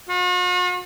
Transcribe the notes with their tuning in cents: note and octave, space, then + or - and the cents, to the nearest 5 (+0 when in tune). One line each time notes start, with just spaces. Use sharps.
F#4 -45